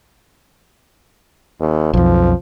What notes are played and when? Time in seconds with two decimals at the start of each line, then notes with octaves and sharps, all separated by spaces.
1.61 D#2
1.93 B1 F2 F3